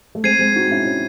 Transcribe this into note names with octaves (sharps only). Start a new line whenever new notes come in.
A3
G#3 C4 G#6 C7 D#7
G#3 C4
D#4 F#4
C#4 E4
C#4